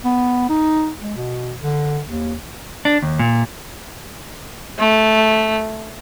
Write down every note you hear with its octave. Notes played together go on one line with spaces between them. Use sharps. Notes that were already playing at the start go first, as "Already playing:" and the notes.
B3
D#4
G#3
B2
D3
D#2
D4
D#2
A#2
A3